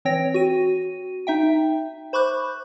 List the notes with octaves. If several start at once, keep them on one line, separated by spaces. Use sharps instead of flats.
E3 C4 C#5 G5 A#6
F#4 D#7
D#4 E5 G5
C5 B5 C#6 D6 F#6 G6